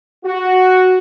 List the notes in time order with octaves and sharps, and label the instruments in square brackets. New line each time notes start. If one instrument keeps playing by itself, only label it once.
[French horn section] F#4